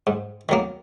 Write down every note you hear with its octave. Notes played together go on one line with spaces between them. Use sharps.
G#2
D#3 F#3 A#3